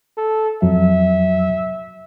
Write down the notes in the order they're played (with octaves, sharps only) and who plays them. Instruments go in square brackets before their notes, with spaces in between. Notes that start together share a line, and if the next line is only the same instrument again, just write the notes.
[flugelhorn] A4
[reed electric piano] F2 F#3 [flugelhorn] E5